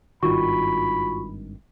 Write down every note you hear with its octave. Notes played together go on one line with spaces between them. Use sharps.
G#1 G2 D#3 F4 F#4 B5 C#6